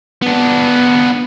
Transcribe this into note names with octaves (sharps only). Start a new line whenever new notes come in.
B3 D4